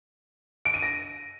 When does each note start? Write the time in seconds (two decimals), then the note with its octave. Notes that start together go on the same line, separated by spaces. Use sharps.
0.65 D7
0.74 D#7
0.83 A#6